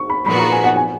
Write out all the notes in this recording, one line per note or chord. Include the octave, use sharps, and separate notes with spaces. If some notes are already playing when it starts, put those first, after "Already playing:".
Already playing: C#6
B5
A#2 F3 B3 F#4 B5
A#5
G#5
F#5
G#5